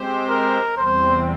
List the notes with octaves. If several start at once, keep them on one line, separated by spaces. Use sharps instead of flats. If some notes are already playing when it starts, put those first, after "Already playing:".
Already playing: G#3 C4 G4 C5
A#4
E2 C3 G3 C4 C5